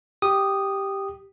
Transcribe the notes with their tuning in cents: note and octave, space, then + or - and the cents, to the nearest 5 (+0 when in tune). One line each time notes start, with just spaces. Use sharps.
G4 +0 D#6 -10